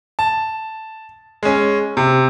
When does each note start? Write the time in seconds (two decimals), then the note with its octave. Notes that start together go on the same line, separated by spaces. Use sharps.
0.19 A5
1.43 G#3 C#4
1.97 C3